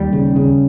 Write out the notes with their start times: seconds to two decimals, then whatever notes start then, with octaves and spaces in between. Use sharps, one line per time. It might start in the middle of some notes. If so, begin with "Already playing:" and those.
Already playing: D#2 G3
0.13 C#3
0.36 C#3